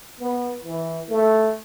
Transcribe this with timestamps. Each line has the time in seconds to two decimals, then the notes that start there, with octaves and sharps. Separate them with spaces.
0.20 B3
0.64 E3
1.10 A3